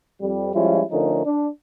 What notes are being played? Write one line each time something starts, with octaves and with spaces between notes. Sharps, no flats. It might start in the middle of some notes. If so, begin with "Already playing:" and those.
F2 G3
F3 G3 G#3 C#4 E4 F4
D3 F3 A3 C#4 D#4 A#4
D4